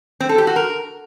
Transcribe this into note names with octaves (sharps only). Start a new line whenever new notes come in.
C4
A4
G4
F#4
A#4